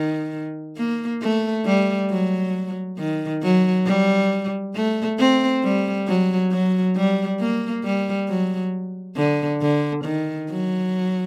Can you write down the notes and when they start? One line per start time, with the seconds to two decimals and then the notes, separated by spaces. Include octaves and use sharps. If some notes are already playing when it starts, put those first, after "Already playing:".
Already playing: D#3
0.77 A#3
1.22 A3
1.65 G3
2.10 F#3
2.98 D#3
3.43 F#3
3.86 G3
4.75 A3
5.19 C4
5.64 G3
6.07 F#3
6.51 F#3
6.96 G3
7.40 A#3
7.84 G3
8.28 F#3
9.16 D3
9.62 D3
10.05 D#3
10.50 F#3